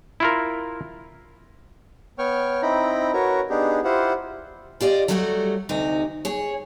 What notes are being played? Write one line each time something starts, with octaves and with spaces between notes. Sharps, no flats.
E4 F4 A#4
B3 C#5 G5 C#6 F6
C4 D#4 E4 G5 A#5 B5
F#4 A#4 B4 C#5 A#5
B3 D4 D#4 G4 G#4
E4 F4 G4 C5 F#5
F4 G4 D5 D#5
F#3 G3 A3 F#4 G#4 F#5
D2 C3 D#4
G#4 C#5